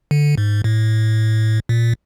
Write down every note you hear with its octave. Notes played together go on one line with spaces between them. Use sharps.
D3
G#2
A2
A#2